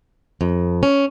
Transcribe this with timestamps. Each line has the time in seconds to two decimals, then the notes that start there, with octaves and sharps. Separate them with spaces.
0.41 F2
0.83 C#4